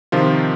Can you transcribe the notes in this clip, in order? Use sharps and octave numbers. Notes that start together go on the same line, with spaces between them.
C3 D#3 F3 F4